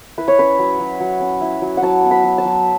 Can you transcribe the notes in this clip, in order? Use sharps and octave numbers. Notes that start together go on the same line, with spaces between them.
E4 B4
C#5
C#4 B4
F#3
F#3
F#3
C#4
E4
F#3
F#5
F#3 A5
B3
B5
F#3
A5
F#3